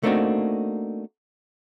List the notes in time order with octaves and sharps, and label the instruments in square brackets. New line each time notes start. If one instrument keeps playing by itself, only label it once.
[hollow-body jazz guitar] A3 A#3 C4 D4 D#4 F#4